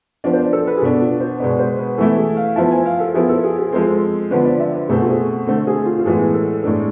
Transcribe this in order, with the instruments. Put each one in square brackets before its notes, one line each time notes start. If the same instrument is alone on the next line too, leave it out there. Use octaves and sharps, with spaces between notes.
[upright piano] F3 B3 D4 [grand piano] D5
[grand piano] C5
D5
A4
B4
G#4
[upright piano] B2 B3 D4 [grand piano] A4
[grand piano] F4
C5
[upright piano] B2 G#3 B3 [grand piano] D5
[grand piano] C5
B4
[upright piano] E3 A3 E4 [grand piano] A4
[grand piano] G#4
F5
[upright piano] F3 B3 E4 [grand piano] A5
[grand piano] G#5
F5
A4
[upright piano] F3 B3 E4 [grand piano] G#4
[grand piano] A4
G#4
G#4
[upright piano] F3 G#3 C4 [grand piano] A4
[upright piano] D3 F3 B3 D4 [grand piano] B4
[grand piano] D5
E5
B4
[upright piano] B2 A3 C4 [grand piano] G#4
[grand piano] F4
G#4
[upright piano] D3 A3 C4 [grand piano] A4
[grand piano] G#4
F4
F4
[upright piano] A2 E3 G#3 B3 [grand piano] G#4
[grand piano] A4
[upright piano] A2 G#3 D4 [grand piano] A4